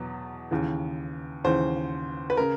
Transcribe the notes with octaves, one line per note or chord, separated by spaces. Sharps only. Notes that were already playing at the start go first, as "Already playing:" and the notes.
Already playing: E2 B2 F#3
D#2 C#3 E3
D#2 C#3 E3 C5
B4
C#3 A#4